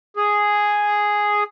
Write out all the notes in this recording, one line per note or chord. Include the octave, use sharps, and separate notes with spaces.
G#4